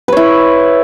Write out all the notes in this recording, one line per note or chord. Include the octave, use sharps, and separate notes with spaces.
E4 B4 C#5